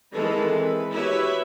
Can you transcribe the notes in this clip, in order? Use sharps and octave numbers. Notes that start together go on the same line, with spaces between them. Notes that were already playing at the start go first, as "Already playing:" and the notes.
D#3 E3 G#3 C4 A4 B4
B4
E4 F#4 G4 B4 C#5 E5